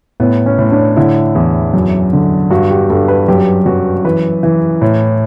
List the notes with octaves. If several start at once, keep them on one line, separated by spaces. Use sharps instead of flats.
A2 B3
C#4
A2
D4
D3 E4
E2
F#2
D3
G2 F#4
G4
G2 A4
B4
F#2 G4
F#2 F#4
E3 B4
E3
A2